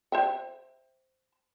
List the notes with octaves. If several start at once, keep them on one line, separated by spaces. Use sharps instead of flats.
C5 E5 G5